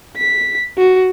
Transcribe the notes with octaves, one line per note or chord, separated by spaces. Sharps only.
B6
F#4